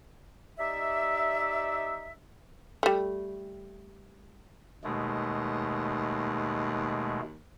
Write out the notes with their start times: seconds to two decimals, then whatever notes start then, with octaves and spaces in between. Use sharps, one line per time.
0.59 D#4 G4 D5 E5
2.83 G3 A3
4.84 D#2 B2 G#3 A3